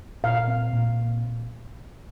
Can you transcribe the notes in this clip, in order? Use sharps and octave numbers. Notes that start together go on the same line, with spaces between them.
A#2 F5
C4
A#2